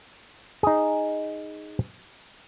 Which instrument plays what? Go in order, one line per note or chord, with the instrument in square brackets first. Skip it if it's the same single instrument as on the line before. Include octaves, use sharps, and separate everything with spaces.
[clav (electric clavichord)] D#4 G#4